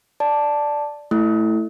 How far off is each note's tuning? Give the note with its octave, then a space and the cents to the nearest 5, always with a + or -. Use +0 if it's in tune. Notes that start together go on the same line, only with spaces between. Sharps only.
D5 +0 A5 +0
A3 +0 E4 +0